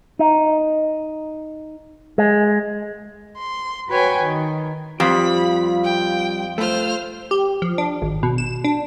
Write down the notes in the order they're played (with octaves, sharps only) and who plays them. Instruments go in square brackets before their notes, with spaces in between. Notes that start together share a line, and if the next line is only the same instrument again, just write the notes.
[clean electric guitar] D#4
G#3
[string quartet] C6
F#4 B4 C#5 G5 G#5
D#3
[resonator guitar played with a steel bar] F2 [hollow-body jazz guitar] G3 C4 G4 [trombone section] F4 [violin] B5 B6
[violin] G5
[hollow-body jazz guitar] A3 F4 [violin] C5 F6
[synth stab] G4
F3
D4
G#1
B2
E7
D4